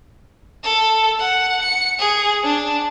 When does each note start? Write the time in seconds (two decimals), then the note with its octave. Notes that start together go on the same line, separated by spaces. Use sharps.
0.63 A4
1.19 F#5
1.62 C#7
1.99 G#4
2.44 D4